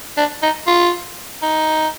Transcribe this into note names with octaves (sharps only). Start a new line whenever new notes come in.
D4
D#4
F4
D#4